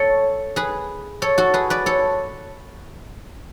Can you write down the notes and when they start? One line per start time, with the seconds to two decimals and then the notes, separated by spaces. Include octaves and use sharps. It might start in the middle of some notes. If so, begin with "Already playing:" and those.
Already playing: A4 C#5
0.56 G#4 B4
1.22 A4 C#5
1.38 F#4 A4
1.54 G#4 B4
1.70 B4 D5
1.86 A4 C#5